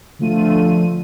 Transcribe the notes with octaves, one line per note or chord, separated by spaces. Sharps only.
D3 F3 A3 F4 D#7